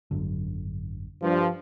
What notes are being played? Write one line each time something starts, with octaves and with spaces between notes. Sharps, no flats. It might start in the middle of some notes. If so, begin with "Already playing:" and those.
G#1 F#2 D3
G2 F3